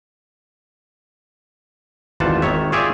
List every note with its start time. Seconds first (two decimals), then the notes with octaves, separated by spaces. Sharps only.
2.20 G#1 E2 G3 F4 F#5 A5
2.42 G#1 D#3 C#5 E5
2.72 F4 G4 G#4 C#5 D5 E5